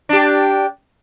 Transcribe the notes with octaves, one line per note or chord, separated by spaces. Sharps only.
D4 G4